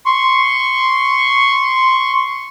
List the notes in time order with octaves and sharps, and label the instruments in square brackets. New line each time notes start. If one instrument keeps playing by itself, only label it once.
[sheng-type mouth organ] C6 C#6